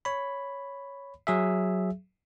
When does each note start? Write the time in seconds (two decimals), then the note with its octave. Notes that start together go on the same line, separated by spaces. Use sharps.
0.05 C#5 B5
1.27 F#3 G#4 E5